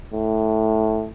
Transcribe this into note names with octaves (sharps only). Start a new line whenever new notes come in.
A2